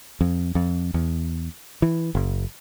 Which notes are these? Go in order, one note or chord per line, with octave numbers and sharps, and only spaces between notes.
F2
F2
E2
E3
F#1